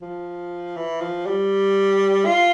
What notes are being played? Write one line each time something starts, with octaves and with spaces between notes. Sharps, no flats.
F3
E3
F3
G3
F4